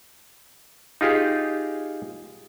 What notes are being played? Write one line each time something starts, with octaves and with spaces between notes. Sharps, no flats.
D#4 F4 G4 G#4